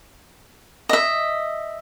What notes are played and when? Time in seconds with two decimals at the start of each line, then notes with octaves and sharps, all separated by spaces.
0.89 D#5 E5